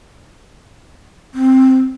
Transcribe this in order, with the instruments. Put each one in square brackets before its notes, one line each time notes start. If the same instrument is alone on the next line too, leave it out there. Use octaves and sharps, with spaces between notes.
[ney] C4